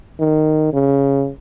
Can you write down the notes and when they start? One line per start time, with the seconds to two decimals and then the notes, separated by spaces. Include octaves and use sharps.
0.20 D#3
0.73 C#3